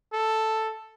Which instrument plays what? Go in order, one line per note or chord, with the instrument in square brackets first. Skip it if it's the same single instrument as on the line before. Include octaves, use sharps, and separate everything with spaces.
[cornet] A4